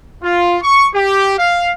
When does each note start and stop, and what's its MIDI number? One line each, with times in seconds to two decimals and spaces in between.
0.24 0.57 65
0.63 0.87 85
0.94 1.35 67
1.39 1.72 77